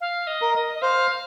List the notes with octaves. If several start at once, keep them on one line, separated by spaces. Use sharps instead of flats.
F5
D#5
A#4
D#5
D#5
C5 F5